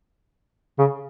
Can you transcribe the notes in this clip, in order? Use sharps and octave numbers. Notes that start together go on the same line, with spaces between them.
C#3